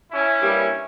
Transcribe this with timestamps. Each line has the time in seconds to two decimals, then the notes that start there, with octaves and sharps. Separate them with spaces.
0.12 C#4 E4
0.40 G2 G3 A#3